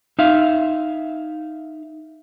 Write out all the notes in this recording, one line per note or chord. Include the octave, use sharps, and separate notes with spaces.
D#4 E5 F5